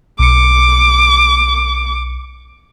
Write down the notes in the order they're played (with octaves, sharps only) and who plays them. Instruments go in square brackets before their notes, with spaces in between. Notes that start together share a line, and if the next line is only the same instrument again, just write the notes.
[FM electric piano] B1 C#7 [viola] D6